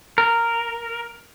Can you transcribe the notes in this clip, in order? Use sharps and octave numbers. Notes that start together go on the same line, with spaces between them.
A#4